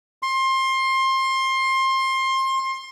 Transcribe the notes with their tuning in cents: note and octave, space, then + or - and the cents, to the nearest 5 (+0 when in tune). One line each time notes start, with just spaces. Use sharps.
C6 +25